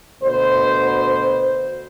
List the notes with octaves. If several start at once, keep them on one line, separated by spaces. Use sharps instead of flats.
D2 B2 C5